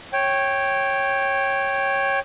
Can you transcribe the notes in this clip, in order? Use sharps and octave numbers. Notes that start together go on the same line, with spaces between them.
C#5 G5